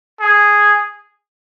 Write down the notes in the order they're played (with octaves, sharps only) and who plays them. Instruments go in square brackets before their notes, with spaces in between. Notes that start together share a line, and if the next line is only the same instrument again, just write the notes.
[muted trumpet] G#4